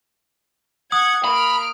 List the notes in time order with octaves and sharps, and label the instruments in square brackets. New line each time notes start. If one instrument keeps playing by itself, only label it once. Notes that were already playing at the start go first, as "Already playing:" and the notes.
[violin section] F#5 G#6 [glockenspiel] D#6
[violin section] A#3 F6 D7 [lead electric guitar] B5